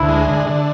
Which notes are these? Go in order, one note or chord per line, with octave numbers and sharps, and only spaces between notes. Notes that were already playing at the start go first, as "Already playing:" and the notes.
Already playing: D2 E4
G#3
D3
D3